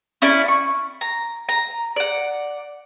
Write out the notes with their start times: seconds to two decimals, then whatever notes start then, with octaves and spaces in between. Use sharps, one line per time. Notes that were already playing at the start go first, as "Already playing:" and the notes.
0.22 C#4 E4 D5
0.48 C#6
1.01 A#5
1.49 A#5
1.96 D5 F#5